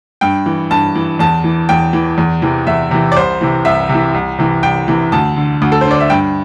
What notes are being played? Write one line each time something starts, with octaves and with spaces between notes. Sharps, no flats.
G2 G5
E3
G2 A5
E3
E2 A5
E3
E2 G5
E3
E2
C3 E3
E2 E5
C3 E3
D5
C2 C5
C3 E3
C2 E5
C3 E3
C2
C3 E3
C2 G5
C3 E3
D2 A5
D3
D2
A4
C5
D3 D5
E5
G2 G5